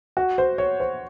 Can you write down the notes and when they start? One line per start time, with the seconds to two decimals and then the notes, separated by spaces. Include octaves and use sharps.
0.17 F#4
0.38 C5
0.58 C#5
0.80 C5